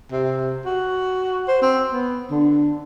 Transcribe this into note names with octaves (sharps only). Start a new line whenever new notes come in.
C3
F#4
C5
C4
B3
D3